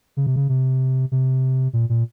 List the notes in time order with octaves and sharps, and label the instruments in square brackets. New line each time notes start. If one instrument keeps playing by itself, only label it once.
[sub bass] C#3
C3
C#3
C3
C3
A#2
A#2